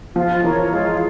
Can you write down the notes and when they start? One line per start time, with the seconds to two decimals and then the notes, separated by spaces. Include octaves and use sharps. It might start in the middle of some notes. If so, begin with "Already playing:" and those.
0.15 F3 F4
0.44 E3 A#4 C#5
0.72 G#3 F4